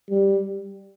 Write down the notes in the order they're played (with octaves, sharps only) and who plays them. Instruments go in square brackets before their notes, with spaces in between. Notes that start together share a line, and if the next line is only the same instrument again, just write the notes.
[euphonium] G3